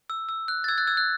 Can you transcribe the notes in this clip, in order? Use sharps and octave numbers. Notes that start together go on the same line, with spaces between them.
E6
E6
F#6
A6
E6 G#6
F#6 A6
E6 G#6
F#6